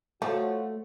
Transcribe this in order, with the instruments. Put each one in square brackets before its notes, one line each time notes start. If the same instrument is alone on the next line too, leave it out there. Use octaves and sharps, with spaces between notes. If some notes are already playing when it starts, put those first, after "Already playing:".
[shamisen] F3 [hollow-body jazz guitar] A3 [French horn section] F4 F#4 C#5